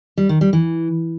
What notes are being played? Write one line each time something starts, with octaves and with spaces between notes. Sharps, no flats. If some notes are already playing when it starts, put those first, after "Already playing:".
G3
D#3
G3
E3